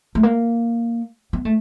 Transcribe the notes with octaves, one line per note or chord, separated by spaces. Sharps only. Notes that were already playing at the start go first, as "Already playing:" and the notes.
A3
A#3
B3
A3